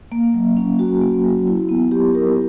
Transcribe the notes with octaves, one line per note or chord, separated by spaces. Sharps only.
A#3
F#3
C#4
F#4
A#3
F#3
E4
B3
G4
A#4